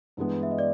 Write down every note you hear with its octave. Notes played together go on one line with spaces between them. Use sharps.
G2 E3 G#3 B3
E5
D#5
D5